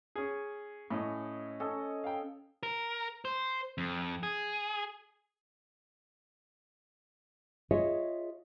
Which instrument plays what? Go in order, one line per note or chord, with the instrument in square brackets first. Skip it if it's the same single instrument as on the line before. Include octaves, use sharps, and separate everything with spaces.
[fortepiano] C#4 G#4
[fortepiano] A2 [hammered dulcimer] C#4 D#5
[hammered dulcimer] C#4 A4 D#5
[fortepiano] F5 G5
[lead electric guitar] A#4
C5
F2
G#4
[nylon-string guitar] F4 G#4 C#5 D#5 E5